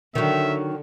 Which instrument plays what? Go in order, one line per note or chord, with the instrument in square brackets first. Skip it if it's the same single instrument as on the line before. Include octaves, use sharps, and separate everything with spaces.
[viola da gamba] D3 [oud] D#3 F#3 [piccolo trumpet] E5